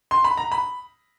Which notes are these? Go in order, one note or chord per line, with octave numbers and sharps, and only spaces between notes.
C6
B5
A#5
B5